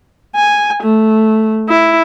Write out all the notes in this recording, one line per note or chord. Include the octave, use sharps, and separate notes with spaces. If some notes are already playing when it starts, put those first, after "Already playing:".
G#5
A3
E4